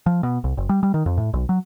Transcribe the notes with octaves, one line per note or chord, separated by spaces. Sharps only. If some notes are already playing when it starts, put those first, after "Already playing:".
F3
B2
C2
F#1
G3
G3
D#3
F2
A2
B1
F#3